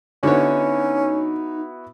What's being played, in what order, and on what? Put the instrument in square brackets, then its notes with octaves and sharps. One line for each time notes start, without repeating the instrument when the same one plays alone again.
[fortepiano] D3 C#5 [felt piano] B3 E4 F#4 [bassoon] C#4 [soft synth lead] D#4